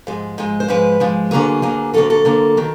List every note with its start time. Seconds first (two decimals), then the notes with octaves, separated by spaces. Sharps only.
0.07 G#2 F3 G#3
0.38 G#2 F3 G#3
0.60 C5
0.68 G#2 F3 G#3 B4
1.00 G#2 F3 G#3
1.31 D2 D3 F#3 A#3 G#4
1.62 D2 D3 F#3 A#3
1.94 D2 D3 F#3 A#3 A4
2.10 A4
2.25 D2 D3 F#3 A#3
2.57 D#3 F#3